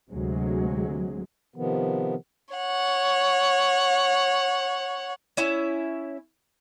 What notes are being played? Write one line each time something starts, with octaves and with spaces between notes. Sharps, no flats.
D2 C3 F#3 G#3
C3 D#3 F3 B3
C#5 F#5
C#4 E4 E5